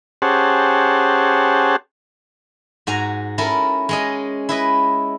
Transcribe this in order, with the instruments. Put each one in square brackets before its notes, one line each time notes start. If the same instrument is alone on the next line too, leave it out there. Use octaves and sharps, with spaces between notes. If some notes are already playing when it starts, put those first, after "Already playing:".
[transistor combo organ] C#4 G4 G#4 C5 F#5 A5
[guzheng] G#2 F#4 G#5 A#5
C#4 E4 A4 A#4
G#3 C#4 D#5
E4 B4 D#5